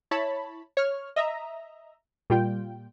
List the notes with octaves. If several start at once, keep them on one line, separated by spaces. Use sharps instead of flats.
E4 C#5 A5 B5
C#5 F6
D#5 E5 A#5
A#2 G3 F4 G5